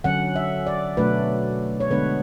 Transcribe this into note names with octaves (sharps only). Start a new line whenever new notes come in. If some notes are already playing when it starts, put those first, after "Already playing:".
D3 F#3 C#4 F#5
E5
D5
B2 F#3 A3 D4 B4
C#5
D3 G#3 B3 D4 B4